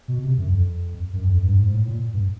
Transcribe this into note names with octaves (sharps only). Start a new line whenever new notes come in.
B2
C3
F#2
F2
F#2
F2
G2
G#2
A2
A#2
G2